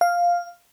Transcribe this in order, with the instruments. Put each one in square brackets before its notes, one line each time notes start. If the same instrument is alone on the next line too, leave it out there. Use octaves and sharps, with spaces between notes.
[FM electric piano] F5